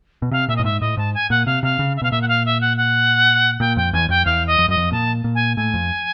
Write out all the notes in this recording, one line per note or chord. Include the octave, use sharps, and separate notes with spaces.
B2
C3 F5
A#2 E5
D#5
A2
G#2 E5
A2 D#5
G#2 A5
G#5
A#2 F#5
C3 F5
C3 F5
C#3
E5
B2 F5
A#2 E5
F#5
F5
E5
F#5
F#5
A#2 G5
F2 G5
E2 G#5
F2 G5
E2 F5
D#5
F2
F#2 D#5
F2
A#2 A5
A#2
G#5
A2 G#5
F2